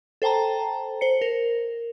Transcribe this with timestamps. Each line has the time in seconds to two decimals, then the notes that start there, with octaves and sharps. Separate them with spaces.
0.22 A4 C5 G5 A5 A#5
1.01 C5 C#7
1.21 A#4